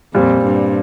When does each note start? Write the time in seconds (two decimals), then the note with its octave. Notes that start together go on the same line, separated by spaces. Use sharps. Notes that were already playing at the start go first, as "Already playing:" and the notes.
0.14 F2 A#2 G3 C4
0.43 G2